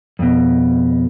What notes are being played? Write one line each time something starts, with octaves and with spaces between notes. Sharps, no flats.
F2 B2